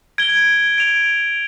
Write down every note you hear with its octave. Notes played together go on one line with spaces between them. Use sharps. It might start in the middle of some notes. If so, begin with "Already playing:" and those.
G#6 D7 G7
G#6 D7 F7